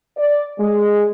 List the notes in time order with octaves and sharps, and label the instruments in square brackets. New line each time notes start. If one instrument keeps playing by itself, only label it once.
[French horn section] D5
G#3